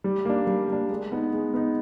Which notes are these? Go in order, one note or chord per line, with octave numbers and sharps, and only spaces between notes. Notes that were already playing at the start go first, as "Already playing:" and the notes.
G3
A#3 D4
G3
A#3 D4
G#3
B3 D#4
G#3
B3 D#4